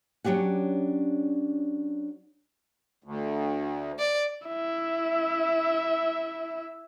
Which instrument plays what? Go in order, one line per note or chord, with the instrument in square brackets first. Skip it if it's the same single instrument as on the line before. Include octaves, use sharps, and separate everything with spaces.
[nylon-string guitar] F#3 C#4 D4 G4 F#5
[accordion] D2
[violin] D5
[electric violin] E4 E5